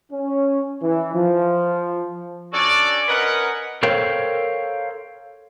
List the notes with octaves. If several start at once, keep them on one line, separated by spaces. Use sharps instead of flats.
C#4
E3
F3
C#4 D4 F#4 A4 D5
C#4 A#4 B4 D#5 F#5
A4 A#4 C5 C#5 F5 G5